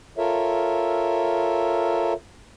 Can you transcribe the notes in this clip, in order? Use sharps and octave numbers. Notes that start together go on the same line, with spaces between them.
F4 A4 A#4 C#5 E5